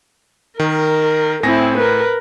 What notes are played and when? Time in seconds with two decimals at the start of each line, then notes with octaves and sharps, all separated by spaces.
0.60 D#3 A#4
1.43 A2 C4 E4 G#5 A#6
1.77 A#4 B4